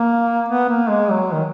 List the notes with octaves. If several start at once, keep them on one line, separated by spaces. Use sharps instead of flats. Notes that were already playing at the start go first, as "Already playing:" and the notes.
Already playing: A#3
B3
A#3
G#3
F#3
D#3